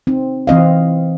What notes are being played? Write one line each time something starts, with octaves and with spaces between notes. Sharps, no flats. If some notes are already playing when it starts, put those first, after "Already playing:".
C4 D#4
E3 C4 D#5 F5